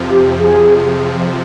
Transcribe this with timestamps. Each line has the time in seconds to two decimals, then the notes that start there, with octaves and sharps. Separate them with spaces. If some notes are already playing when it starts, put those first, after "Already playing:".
Already playing: F2 C3 F3
0.10 G4
0.39 G#4